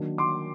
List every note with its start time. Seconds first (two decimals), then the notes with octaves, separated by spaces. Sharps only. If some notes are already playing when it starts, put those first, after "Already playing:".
Already playing: D#3 F#3 A#3 D4
0.18 C6 D6